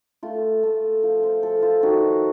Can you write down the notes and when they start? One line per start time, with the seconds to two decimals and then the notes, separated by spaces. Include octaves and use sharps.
0.23 A3 F4
0.63 A3
1.03 F3
1.23 C5
1.43 F3 A4
1.62 F4
1.83 D#3 F#4